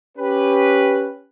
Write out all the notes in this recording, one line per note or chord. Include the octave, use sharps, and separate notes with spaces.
C#4 G4 B4